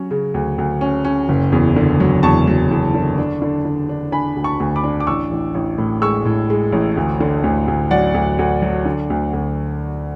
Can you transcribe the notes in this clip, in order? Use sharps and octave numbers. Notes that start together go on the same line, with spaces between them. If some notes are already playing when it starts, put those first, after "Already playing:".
Already playing: F#3 C#4
C#3
D2
D2
C#4
C#4
F#1
E2
D3
F#3
E2 A5 C#6
F#3
E2
D3
D4
D3
D3
D4
D4 G#5 B5
D2
A5 C#6
D2
B5 D6
D4
D6
A1 C#6 E6
A1
A1
A2
G#3 C#6 E6
A2
G#3
A1
D2
D3
D2
D2
F#3 D5 F#5
D2
D2
F#3
D3
D2
D2